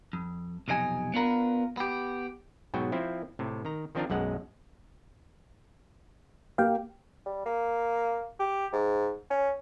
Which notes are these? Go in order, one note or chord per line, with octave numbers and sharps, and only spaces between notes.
F2
B1 F2 C3 D#5 G#5
B3 D4 F4 A#4 B4
B3 G4
G#2 B2 F#3 F#4 G5
F3 C4 E4
A2 C3
D#3 A#5
D#3 F3 C4 D4 F4 A#4
B1 F#2 G#3 F#5
A#3 G4 F5 G5
G3
A#3
G4
G#2
C#4